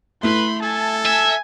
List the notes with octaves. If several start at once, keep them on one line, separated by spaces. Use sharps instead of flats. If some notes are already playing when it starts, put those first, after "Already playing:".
A3 E4 B4 B5 C6
A4 G#5 A5
E5 G#5